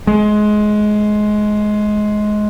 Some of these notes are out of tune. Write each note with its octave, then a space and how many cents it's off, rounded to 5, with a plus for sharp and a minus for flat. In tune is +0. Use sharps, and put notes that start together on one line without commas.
G#3 +20